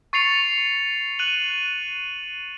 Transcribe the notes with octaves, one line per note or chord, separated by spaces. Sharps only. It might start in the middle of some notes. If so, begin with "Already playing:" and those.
C#6 A6 C7 C#7 F7
F#6 D#7 F#7